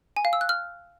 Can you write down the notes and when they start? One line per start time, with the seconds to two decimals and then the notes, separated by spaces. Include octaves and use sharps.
0.16 G#5
0.25 F5
0.33 E6
0.41 F#6
0.49 F6